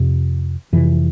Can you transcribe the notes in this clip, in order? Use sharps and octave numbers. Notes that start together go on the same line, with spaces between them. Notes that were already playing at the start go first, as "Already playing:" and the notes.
Already playing: F2 C3
F2 C3 E3